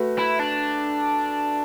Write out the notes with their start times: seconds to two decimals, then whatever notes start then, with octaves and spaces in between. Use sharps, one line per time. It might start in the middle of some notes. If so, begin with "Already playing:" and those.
Already playing: A3 F#4 B4
0.19 E4
0.39 D4